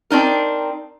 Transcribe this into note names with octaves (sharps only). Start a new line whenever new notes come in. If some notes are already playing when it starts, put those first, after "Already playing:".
C4 D4 D#4 A#4